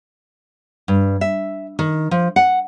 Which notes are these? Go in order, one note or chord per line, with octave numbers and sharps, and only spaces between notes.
G2
E5
D#3
F3
F#5